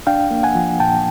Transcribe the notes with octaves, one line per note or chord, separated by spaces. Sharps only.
D4 F5 G5
A#3
F#5 G#5
F3
A#2 G5 A5